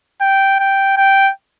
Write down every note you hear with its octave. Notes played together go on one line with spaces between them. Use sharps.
G5
G5
G5